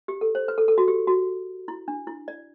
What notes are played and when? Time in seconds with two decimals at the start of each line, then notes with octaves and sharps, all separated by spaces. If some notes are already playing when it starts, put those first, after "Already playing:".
0.08 G4
0.21 A4
0.35 C5
0.48 B4
0.58 A4
0.68 A4
0.78 F#4
0.88 G4
1.07 F#4
1.68 E4
1.88 D4
2.07 E4
2.28 D5